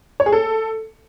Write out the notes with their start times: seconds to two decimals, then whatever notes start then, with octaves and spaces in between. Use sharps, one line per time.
0.20 C#5
0.26 G#4
0.32 A4